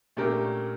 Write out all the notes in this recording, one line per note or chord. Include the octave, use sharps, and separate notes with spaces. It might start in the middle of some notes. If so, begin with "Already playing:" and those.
A#2 A3 C#4 D4 G4 A#4
A#3
C#4